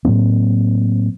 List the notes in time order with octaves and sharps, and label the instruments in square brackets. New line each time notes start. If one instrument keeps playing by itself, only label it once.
[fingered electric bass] A2 F#3 A#3 C4